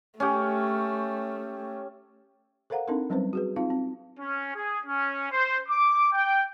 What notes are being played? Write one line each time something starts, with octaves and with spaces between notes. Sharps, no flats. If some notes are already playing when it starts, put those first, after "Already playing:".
A3 C#4 G4
A4 A#4 C5 F5 F#5 A#5
C4 D4 D#4 A4 A#4
F#3 G3 C4 C#4 B4 C5
F#4 G#4 B4
C4 D#4 F4 F5
C4
C#4
G#4
C#4
C5
D6
G5